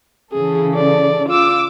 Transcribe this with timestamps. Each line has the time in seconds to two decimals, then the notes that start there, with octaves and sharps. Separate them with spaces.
0.32 C#3 E3 G#4 A4
0.76 D5
1.29 F4 D6 E6